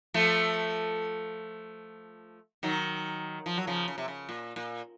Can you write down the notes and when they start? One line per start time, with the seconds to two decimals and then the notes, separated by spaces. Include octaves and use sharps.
0.14 F3 A3
2.63 D#3 F#3
3.46 F3
3.57 F#3
3.67 C#3 F3
3.88 C#3
3.98 C3
4.08 C#3
4.29 A#2
4.56 A#2